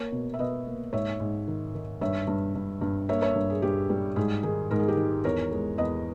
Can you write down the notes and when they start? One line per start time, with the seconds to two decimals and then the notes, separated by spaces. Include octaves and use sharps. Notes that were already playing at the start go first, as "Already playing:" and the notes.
Already playing: A#3 A#4 C#5
0.12 B2
0.34 E5
0.39 B2 B4 D#5
0.66 A#3
0.93 G#2 C#5 E5
1.20 G#2
1.47 D#3
1.75 D#3
2.01 G2 C#5 E5
2.27 G2
2.55 G2
2.81 G2
3.09 A#3 C#5 E5
3.22 C#5 E5
3.35 G2
3.50 G#4
3.62 G2 G4
3.90 G3
4.16 G#2 G#4
4.43 D#3 G#4
4.71 G#2 A#4
4.80 G#4
4.88 G4 A#4
4.97 D#3
5.24 E2 A#4 C#5
5.51 G#3
5.78 E2 B4 D#5